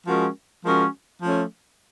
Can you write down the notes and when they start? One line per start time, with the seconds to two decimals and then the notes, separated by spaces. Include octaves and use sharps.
0.07 F3 G#3 C#4 F#4 A#4
0.65 F3 G#3 C#4 F#4 A#4
1.22 F3 A3 C#4